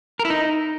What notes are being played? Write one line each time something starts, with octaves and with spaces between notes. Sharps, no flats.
A#4
E4
D#4